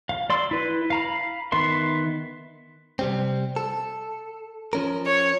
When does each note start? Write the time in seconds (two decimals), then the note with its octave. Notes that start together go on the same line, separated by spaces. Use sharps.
0.09 F5
0.30 D5 C6 E6
0.51 E4 B4
0.90 F5 A#5 B5
1.52 D#3 B3 E5 C6
2.99 C3 G3 C4
3.56 A4
4.73 F3 C#4 A#4
5.06 C#5